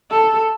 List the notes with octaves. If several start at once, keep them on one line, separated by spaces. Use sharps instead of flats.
A4